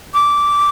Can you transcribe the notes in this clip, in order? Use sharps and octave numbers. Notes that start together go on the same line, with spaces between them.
D6